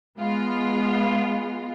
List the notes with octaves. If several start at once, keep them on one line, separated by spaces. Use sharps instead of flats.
G#3 B3 F4